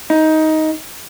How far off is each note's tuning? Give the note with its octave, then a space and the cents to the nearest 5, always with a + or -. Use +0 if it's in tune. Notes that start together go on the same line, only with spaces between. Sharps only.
D#4 +15